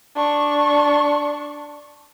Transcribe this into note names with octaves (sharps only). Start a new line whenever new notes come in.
D4 C#6